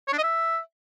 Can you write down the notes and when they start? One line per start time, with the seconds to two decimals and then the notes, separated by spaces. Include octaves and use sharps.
0.08 C#5
0.13 D4
0.18 D#5
0.23 E5